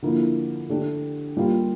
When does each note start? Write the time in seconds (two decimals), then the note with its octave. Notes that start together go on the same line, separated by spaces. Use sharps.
0.02 D3 F3 A#3 E4
0.69 D3 A3 D4 G4
1.37 G3 A#3 F4